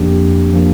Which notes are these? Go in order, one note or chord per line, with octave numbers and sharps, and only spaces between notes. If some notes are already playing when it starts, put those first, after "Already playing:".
Already playing: F2 F3 A#3 D4 G4
F2
F3 A#3 D4